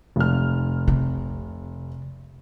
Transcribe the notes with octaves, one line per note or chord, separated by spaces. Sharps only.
F1 F6
C3